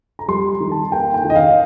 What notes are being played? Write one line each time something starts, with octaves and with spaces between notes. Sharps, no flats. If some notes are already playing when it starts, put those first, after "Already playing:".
A#5
G3 C6
D#3
A5
A#3 G5
G5
D#3
D#5
F5